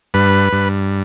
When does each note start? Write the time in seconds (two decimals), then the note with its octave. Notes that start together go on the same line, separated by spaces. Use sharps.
0.14 G2 B4
0.53 G2